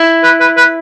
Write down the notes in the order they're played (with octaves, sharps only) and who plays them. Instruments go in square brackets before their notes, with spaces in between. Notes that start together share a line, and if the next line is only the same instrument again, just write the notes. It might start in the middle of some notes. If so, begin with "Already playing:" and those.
Already playing: [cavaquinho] E4
[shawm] B4
B4
B4